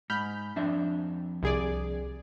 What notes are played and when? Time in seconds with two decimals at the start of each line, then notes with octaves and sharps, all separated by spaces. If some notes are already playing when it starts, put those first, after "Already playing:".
0.10 G#2 B5 F6 G6
0.56 F2 D4 E5
1.43 C2 G#4 D5